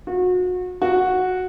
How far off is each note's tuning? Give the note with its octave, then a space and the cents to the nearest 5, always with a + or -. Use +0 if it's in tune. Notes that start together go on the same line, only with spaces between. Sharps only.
F#4 -30
F#4 -5